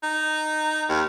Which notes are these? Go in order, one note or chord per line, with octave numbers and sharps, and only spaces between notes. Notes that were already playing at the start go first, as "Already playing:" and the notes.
D#4
D#2